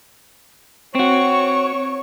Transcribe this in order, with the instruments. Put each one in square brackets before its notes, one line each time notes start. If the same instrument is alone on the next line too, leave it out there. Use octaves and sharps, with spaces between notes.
[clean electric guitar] C4 F#4 [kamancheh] C#5 C#6